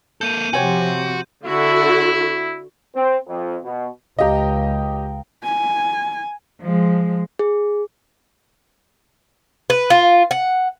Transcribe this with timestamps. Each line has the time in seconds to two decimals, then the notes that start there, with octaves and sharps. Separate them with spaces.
0.21 A#3 A4 G6 D#7
0.53 C3 F3 F#4 G4 C#5 G#5
1.45 D3 E4 F#4
2.95 C4
3.27 F2
3.64 B2
4.18 C#2 G4 D#5 F5 G5 A#5
5.43 G#5
6.61 F3 G#3
7.39 G#4
9.70 B4
9.90 F4
10.31 F#5